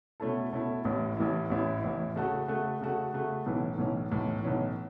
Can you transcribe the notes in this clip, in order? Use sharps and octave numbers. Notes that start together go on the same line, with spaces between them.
B2 A3 C#4 E4 A4
B2 A3 C#4 E4 A4
A1 A2 E3 C#4 E4
A1 A2 E3 C#4 E4
A1 A2 E3 C#4 E4
A1 A2 E3 C#4 E4
C#3 A3 F#4 A4
C#3 A3 F#4 A4
C#3 A3 F#4 A4
C#3 A3 F#4 A4
B1 A2 E3 C#4
B1 A2 E3 C#4
B1 A2 E3 C#4
B1 A2 E3 C#4